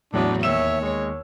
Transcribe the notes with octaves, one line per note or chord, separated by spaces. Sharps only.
E2 A2 F#3 B3 D4
D#2 C#5 E5 E6 E7
G#3